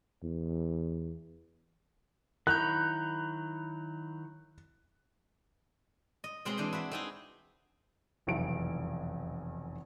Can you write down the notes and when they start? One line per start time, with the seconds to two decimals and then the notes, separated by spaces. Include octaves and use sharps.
0.23 E2
2.47 D#3 F#3 E4 A#5 C#6 F#6 G6
6.24 D#5
6.45 B2 G#3 C4 G#4 C#5 C6
6.57 E3 D4 C5 D#5
6.73 E4 F#4 E5
6.91 C4 D#4 G#4
8.27 F1 B1 E2 E4 D7